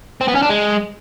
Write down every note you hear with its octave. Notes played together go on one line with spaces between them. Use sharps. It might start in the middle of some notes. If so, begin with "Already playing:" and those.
C4
B3
C#4
D4
G#3